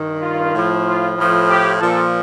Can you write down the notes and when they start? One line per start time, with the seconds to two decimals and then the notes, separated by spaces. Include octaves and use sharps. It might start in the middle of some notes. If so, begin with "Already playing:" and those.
Already playing: G2 D#3
0.23 F4
0.53 A2 F3
0.86 F4
1.17 A2 F3
1.49 G4
1.80 A#2 F3 A4